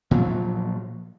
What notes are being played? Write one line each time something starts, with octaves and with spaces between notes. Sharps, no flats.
A#2 F3 F#3